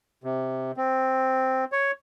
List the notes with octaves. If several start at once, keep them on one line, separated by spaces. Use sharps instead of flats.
C3
C4
C#5